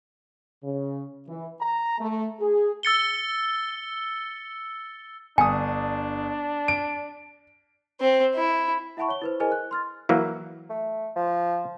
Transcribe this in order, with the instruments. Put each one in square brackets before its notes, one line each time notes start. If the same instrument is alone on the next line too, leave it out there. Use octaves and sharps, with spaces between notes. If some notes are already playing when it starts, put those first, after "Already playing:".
[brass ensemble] C#3
E3
A#5
A3
G#4
[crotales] E6 A6 C#7 G7
[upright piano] G1 D#6 [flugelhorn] D4 [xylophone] G#5
[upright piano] D7
[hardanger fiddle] C4
E4
[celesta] E4 E5 F#5 A5 B5 C#6
C#5 G7
E4 B4 C5
E4 G#4 A#4 C5 D#5 G#5
F#6
C6 F6 A6
[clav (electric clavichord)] E3 F#3 A#3
[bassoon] A3
F3